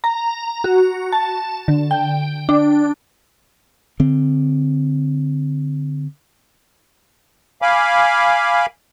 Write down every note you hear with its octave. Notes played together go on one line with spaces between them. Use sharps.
A#5
F#4
A5
D3
G5
D4
D3 C4
F5 G#5 B5 D6